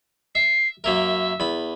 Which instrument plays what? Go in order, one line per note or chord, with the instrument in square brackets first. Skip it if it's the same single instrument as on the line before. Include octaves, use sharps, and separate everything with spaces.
[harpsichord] E5 [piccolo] C7
[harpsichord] F#2 A#3 A#4 [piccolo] E5
[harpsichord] E2 B5